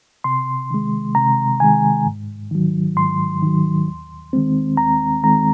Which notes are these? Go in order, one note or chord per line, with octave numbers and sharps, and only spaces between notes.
C3 C6
D#3 G#3
C3 A#5
D#3 G#3 G#5
G#2
D#3 F#3
G#2 C6
D#3 F#3
D#2
D#3 G#3 C4
D#2 A#5
D#3 G#3 C4 A#5